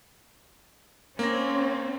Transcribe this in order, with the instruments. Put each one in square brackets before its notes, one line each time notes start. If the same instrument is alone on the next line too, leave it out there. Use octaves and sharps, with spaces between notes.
[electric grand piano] A#3 A#6 [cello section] C4 C#4